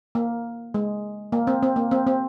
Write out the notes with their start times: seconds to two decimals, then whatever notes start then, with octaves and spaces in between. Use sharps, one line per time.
0.15 A#3
0.74 G#3
1.32 A#3
1.47 C4
1.63 C4
1.76 A#3
1.91 C4
2.07 C4